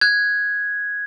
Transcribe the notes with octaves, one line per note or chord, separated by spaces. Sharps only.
F#6 G#6